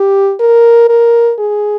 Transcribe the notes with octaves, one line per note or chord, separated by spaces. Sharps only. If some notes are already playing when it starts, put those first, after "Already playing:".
Already playing: G4
A#4
A#4
G#4